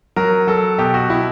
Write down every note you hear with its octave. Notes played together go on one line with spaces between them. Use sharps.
F#3 A#4
F#3 A4
B2 G4
F#4
B2 E4